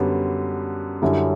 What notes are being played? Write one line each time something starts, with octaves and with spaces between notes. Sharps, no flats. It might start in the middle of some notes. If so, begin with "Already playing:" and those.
Already playing: F#2 D3 G3 B3
F#2 D3 G3 C#4 E4